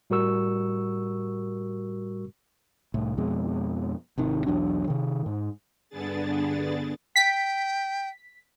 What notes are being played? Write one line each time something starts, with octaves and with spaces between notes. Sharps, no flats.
A2 G3 F#4 A#4 C#6 E6
C2 A2
F2 B2 G#3
G#1 C3 D#3
B1 E2 F#3 D4
C3 D#3
G#2
G2 D3 B3 D4 G#4 A6
G5 B6